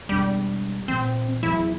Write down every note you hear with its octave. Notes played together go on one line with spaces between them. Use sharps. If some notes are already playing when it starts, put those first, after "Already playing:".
E1 G3 D4
A#2 E3 C4
E2 F#3 E4